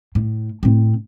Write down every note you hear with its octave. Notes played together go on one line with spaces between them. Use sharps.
A2
A2 C4